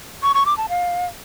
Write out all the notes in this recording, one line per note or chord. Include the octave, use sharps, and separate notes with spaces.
C#6
C#6
D6
A5
F5